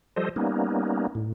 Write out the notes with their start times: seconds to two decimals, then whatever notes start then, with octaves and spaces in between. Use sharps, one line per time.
0.16 F3 G3 A4 C5 D#5
0.36 G3 A#3 B3 C#4 D#4
1.15 A2